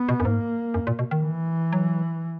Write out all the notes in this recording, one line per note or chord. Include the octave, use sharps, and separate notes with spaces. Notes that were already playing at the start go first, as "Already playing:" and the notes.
Already playing: B3
B2
F#2
G#2 A#3
F#2
A#2
B2
D#3
E3
F#3